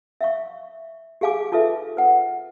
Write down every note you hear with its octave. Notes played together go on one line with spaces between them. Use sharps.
E5 F5 C#6
G4 G#4 F5 G#5 D6
D#4 F4 A4 B4 E5
B4 F#5